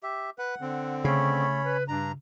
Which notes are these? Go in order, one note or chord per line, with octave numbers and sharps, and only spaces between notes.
G4 E5
B4 F#5
D3 C4
C#3 A3 C#4 C#5 B5
B4
G2 D4 A#5